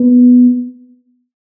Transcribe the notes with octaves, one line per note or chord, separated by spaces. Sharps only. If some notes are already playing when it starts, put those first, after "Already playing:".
Already playing: B3